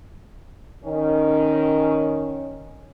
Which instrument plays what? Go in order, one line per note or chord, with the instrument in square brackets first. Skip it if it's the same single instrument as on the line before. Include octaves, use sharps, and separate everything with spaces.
[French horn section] D#3 C#4